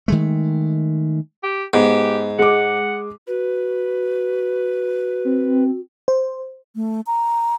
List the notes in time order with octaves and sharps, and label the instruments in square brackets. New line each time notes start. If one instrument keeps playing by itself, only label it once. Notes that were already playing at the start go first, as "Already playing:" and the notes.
[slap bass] D#3 G#3 A3
[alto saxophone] G4
[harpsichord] G#2 [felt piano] B3 [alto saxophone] G4
[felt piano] G#3 D6 [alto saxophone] F#5
[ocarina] F#4 [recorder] B4
[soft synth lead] C4
[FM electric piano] C5
[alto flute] A3
A#5